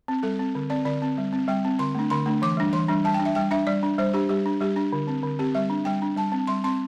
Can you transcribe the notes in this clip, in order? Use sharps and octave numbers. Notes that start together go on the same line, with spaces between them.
C4
G3 A4
C4
D3
C4 D5
D3 D5
C4
G3
C4
G3 G5
C4
D3 C6
A3 D4
D3 C6
A3 D4
E3 D6
G3 D4
E3 C6
G3 D4
G3 A5
G5
D4
E5
G3 G5
D4 E5
G3 D5
D4
G3 C5
D4 G4
G3 G4
D4
G3 G4
D4
D3
C4
D3
C4 G4
G3 E5
D4
G3 G5
D4
G3 A5
C4
G3 C6
C4 C6